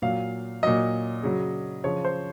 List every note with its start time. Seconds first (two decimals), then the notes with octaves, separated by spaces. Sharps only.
0.02 A#2 F#3 F5
0.63 A#2 F#3 D#5
1.23 C#3 F#3
1.84 C#3 F3 C#5
2.05 C5